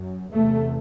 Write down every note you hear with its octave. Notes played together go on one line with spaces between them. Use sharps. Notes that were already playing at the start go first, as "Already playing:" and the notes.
Already playing: F#2
E2 C3 A3